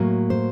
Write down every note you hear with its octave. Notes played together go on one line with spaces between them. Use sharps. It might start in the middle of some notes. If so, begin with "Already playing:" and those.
Already playing: A2 F#3 A#3
C5